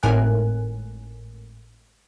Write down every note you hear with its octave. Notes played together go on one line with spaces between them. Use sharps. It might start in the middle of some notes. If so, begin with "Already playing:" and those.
G#1 A2 A#4 G#5 F#6